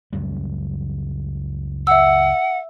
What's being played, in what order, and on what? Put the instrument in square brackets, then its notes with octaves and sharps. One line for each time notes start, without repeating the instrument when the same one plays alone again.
[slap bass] C#2 F#2 G3
[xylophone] E5 E6 [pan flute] F#5